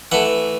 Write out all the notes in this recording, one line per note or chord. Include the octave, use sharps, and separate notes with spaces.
E3 A3 F#5